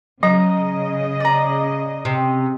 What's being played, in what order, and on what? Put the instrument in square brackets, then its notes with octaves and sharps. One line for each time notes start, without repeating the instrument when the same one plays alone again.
[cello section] C#3 D#5 [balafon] F#3 [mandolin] A#5
[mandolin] D5 A#5
[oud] C3